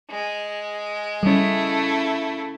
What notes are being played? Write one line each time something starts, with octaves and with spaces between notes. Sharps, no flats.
G#3
C#3 G3 A3 C#4 E4